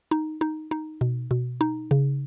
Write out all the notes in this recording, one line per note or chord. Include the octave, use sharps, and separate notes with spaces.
D#4
D#4
D#4
B2
B2
D#4
C#3